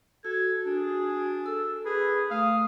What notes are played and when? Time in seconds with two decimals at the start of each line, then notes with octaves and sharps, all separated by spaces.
0.25 F#4 A4 G#6
0.66 D4 G#4
1.46 A4 E6
1.86 G#4 B4
2.31 A3 F5 D#6